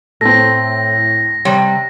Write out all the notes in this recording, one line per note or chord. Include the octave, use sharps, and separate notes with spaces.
A2 A3 C4 A#6
C3 G3 C#5